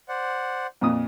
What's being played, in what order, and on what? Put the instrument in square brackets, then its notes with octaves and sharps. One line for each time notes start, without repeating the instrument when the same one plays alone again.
[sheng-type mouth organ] C5 D5 F#5
[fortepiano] F2 A#2 D#6